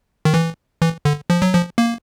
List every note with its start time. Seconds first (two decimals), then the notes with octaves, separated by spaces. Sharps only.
0.25 D#3
0.34 E3
0.82 E3
1.05 D3
1.30 F3
1.42 F#3
1.54 F3
1.78 A#3